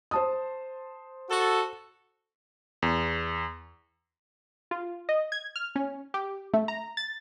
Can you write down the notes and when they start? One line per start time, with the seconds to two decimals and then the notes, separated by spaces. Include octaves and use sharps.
0.11 C5 A5 D#6
1.29 F#4 A4
2.82 E2
4.71 F4
5.09 D#5
5.32 G#6
5.56 F6
5.76 C#4
6.14 G4
6.54 A3
6.68 A#5
6.97 A6